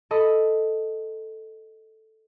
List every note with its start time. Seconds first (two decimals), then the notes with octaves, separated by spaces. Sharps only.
0.11 A4 D#5 B5